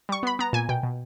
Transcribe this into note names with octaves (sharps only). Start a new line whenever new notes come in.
G3 C#6
B3 B5
B3 A#5
A#2 G#5
B2 G5
B2